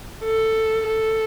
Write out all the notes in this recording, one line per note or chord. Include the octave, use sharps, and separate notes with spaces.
A4
A4